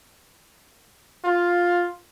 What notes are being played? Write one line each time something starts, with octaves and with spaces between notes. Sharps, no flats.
F4